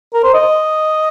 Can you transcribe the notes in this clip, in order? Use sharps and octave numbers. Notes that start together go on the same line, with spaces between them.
A#4
C5
D#5